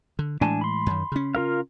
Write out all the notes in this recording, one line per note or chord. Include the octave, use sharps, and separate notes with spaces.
D3
A2 E3 G#3 D4 G#5 A5
B5 C6
F#2 D#3
C#3 C#4
F4 A#4 F5